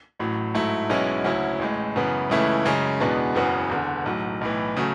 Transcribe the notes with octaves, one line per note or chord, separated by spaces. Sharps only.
A1 A2 F#3
G#2 F#3 A3 E4
B1 B2 G#3 C#4 E4
D2 C#3 F#3 C#4 E4
A1 A2 G#3
F#2 C#3 E3 B3
C#2 C#3 E3 A3 E4
F#2 C#3 G#3 C#4
E2 B2 G#3 B3 D4
F#1 E2 C#3 F#3 B3
E1 E2 D3
B1 A2 F#3
B1 A2 E3
C#3 F#3 A3